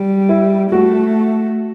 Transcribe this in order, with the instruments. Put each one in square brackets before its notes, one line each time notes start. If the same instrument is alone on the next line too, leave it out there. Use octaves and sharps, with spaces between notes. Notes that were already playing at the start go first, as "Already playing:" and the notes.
Already playing: [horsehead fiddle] G3
[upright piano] E4
[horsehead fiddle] A3 [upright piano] F#4